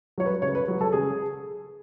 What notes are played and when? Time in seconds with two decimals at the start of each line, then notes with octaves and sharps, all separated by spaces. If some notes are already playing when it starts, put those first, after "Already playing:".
0.18 F#3 C#5
0.26 B4
0.42 C#3 C#5
0.55 B4
0.68 F#3
0.81 A4
0.92 C#3 G#4